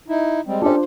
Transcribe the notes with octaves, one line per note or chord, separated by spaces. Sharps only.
D#4 E4
G3 G#3 C4
C#4 D4 F4 G4 A4 C5